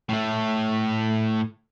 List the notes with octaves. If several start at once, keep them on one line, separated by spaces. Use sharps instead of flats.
A2 A3